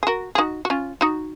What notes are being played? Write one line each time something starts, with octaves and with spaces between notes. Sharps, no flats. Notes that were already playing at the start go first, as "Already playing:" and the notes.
G#4
F#4 A#4
G#4
D#4 F#4
F#4
C#4 F4
D#4 F#4